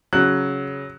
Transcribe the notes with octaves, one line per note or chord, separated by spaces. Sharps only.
C#3 F#3 F#6